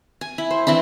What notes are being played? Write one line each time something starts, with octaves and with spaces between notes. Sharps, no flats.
G#5
E4
C5
E3 C4 D4 E4